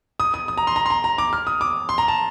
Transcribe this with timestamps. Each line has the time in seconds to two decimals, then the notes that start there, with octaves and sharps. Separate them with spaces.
0.20 D#6
0.34 D#6
0.48 D#6
0.57 A#5
0.67 C6
0.76 A#5
0.86 C6
0.90 A#5
1.04 A#5
1.18 D6
1.33 F6
1.47 D#6
1.61 D6
1.89 C6
1.98 A#5
2.08 A5